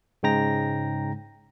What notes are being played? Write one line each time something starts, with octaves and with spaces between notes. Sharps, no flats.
G#2 C#3 G#3 G5 A#5 A#6